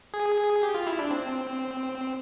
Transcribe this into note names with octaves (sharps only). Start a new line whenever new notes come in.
G#4
G4
F4
E4
D4
C4